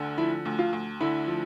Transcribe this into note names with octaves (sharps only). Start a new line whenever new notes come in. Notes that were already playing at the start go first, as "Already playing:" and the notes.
Already playing: D2 D3
F3 E4
D2
F4
D2
D3 E4
F3